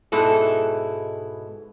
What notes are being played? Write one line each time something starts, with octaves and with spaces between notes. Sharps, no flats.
G#2 B2 G#3 E4 A4